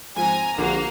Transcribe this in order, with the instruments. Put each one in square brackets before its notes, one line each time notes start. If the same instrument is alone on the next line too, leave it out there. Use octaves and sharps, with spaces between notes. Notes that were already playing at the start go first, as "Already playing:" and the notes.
[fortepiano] G#2 F3 C4 [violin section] G#5 A#5
[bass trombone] A#1 [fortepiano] D3 F#4 [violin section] A#3